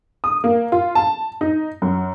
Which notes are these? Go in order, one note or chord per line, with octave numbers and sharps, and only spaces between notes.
D#6
A#3
F4
A5
D#4
F#2